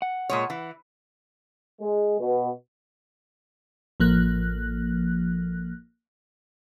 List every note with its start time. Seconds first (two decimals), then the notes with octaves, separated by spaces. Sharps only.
0.02 F#5
0.29 A#2 G#3 C#5
0.50 E3
1.81 G#3
2.19 B2
4.00 A1 F3 A#3 F#6